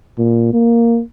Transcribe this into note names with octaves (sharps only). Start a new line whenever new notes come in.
A#2
A#3